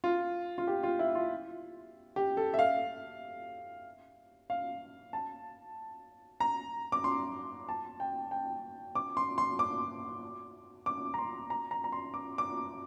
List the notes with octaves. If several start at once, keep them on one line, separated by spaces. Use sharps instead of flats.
F4
F4
G4
F4
E4
F4
G4
A4
E5
F5
F5
A5
A#5
D6
C6
A5
G5
G5
D6
C6
C6
D6
D6
A#5
C6
A#5
A#5
A#5
C6
D6
D6